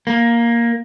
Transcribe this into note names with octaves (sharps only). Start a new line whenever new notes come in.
A#3